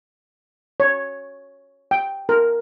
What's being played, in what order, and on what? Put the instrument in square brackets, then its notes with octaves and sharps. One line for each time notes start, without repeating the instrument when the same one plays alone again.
[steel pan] C#5
G5
A#4